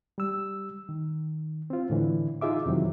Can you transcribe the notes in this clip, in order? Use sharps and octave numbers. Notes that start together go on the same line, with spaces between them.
G3 E6
D#3
C4 F4
A2 D3 E3
D#4 F4 G#4 E5 D6
F2 C3 D#3 E3 F#3